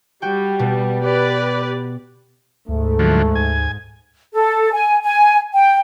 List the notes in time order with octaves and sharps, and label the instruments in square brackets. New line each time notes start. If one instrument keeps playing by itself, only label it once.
[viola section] G3 [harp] F#4 G5
[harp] B2
[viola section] G4 B4 D5
[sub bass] D2 [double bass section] G#2 [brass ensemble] A3
[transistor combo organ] D3 F3 F#3
[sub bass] D2 [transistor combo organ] G#5
[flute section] A4
G#5
G#5
G5